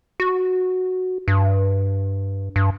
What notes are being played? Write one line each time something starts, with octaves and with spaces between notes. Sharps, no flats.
F#4
G2
G2